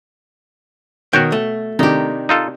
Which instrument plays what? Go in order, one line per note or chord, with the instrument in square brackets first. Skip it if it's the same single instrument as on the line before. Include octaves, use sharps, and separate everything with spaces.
[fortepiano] B2 [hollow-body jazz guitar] D#3 [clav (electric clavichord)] F#4 C#5 G5
[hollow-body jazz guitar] A3
[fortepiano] C3 D#3 D4 [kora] D#4 G4
[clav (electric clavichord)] D#4 F4 A4